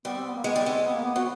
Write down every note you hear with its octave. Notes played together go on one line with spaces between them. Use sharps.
G3 B3
C4
B3
A#3
G#3 B3
G3
G#3 C4
B3
A#3
B3
F#3 B3